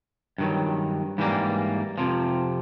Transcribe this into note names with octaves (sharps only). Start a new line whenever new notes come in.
G2 D#3 F#3
G#2 E3 G3 A#3
F2 C3 F3